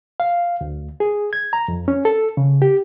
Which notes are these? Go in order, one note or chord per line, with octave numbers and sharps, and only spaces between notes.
F5
D2
G#4
G#6
A#5
F2
C#4
A4
C#3
G4